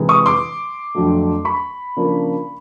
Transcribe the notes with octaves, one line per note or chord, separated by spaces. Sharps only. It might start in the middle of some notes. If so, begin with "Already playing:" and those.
Already playing: C3 E3 G#3
C#6 D#6
C6 D6
F2 D3 F#3 A3
B5 C#6
C#3 F3 A#3 D4 F4